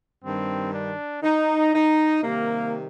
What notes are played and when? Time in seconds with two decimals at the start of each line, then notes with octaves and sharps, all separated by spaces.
0.23 G2 D#3 G3 C4
0.74 D4
1.23 D#4
1.74 D#4
2.23 C3 D#3 G3 A#3